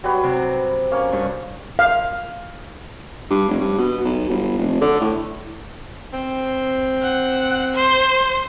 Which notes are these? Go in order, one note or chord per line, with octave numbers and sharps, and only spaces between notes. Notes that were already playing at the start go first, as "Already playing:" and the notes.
F#3 G3 B4
C3
A#3 C#4
G2 C#6
F5
G2
F1
G2
B2
B1
G1
F1
D3
A2
C4
F#5
C5